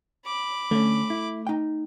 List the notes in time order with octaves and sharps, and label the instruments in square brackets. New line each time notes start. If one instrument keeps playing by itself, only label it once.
[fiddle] B5 D6
[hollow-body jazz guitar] D3 C#4 [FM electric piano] A3
[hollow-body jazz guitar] E4
D#4 G5